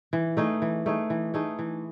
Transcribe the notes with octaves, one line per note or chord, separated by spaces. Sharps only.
E3
A3 D#4 G#4
E3
A3 D#4 G#4
E3
A3 D#4 G#4
E3